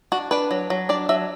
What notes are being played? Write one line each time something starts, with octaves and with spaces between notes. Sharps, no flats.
D4 F#4
D4 B4
F#3
F#3
D4 D5
F#3 E5